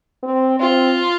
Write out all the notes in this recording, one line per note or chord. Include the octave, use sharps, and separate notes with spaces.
C4
C4 F4